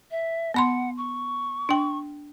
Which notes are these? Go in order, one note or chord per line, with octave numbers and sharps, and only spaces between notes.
E5
B3 F#5 B5 C6
C#6
D4 G5